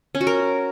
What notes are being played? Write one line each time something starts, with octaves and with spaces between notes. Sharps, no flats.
C#4
F#4
A#4